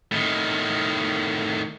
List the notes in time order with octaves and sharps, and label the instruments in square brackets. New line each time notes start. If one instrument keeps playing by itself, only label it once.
[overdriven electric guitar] A2 D#3